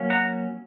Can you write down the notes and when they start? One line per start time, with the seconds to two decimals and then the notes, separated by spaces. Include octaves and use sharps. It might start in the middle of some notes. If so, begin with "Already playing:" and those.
Already playing: F#3 A#3 C#4
0.10 F#5 A#5